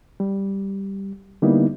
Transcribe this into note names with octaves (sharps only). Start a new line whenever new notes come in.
G3
D3 G3 A#3 B3 D#4 E4